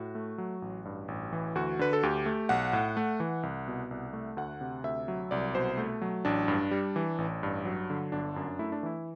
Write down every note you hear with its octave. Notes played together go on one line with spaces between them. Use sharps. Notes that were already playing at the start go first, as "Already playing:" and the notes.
Already playing: A2 F#4
A3
F#3
A1
G2
A1
E3
D2 F#4
D3 B4
A4
D2 G4
A3
B1 F#5
A2
A3
E3
C2
B2
C2
A3
D2 F#5
C3
D2 E5
F#3
C2 D5
B2 C5
A3
F#3
A1 D4
G2
G3
E3
A1
G2
F#3
D3
G1 D4
F#2
A3 E4
D4
E3 E4